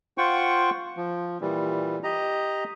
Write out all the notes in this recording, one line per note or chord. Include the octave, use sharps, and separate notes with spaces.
F4 C5 F#5 G5 C#6
F3
A#2 E3 G3
G4 D#5 A#5